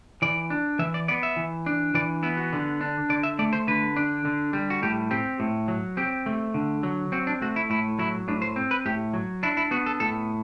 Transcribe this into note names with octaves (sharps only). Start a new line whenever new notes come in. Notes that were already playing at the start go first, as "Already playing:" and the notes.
E3 D5
D4
E3 E5
D5
B3 D5
E5
E3
D4
E3 D5
B3 E4
F#4
D3
D4
D3 D5
E5
A3 D5
C5
D3 B4
D4
D3
G3
F#4
A2 G4
C4 G4
A2
F#3
C4 G4
A3
D3
F#3
C4 F#4
D4
A3 F#4
E4
A2 E4
F#3 E4
A2 D4
C5
C4
B4
A2 G4
F#3
D4 E4
E4
B3 F#4
A4
A2 A4